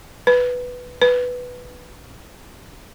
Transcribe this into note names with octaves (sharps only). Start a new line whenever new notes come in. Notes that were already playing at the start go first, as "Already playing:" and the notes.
B4
B4